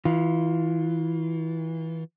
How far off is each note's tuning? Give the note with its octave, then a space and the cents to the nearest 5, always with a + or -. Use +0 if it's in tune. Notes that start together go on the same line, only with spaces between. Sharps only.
E3 -25 F4 +0